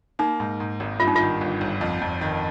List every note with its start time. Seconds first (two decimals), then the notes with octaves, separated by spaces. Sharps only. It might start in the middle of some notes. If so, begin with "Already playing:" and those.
0.19 A#3 D#4
0.40 G#2
0.60 G#2
0.80 G#1
1.00 G2 F4
1.08 D#4
1.16 D#3 F4
1.41 G1
1.61 G1
1.81 F2
2.01 F2
2.21 D#3